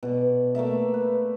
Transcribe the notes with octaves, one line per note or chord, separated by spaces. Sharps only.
B2 D5
A3 A#3 D5 E5
B4